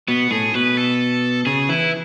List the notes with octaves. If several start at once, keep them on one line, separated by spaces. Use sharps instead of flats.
B2 B3
A2 G#4
B2 B4
A4
C#3 G#4
E3 E4